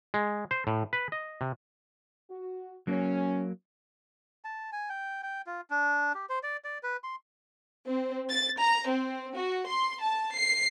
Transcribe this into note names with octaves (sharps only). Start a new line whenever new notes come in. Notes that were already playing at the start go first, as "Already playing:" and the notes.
G#3
C5
A2
B4
D#5
C3
F#4
F#3 A#3 C#4
A5
G#5
G5
G5
F4
D4
G4
C5
D5
D5
B4
C6
C4
A6
A#5
C4
F#4
C6
A5
C7